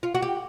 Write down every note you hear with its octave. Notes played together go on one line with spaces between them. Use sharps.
F4
F#4
G4